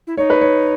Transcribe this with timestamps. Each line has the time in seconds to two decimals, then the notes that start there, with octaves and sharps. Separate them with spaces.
0.07 E4
0.17 D#4 C#5
0.30 B4
0.41 C#5